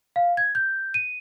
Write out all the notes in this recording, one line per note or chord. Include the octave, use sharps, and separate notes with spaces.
F5
G#6
G6
D#7